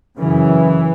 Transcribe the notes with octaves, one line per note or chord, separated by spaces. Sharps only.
F#2 C#3 E3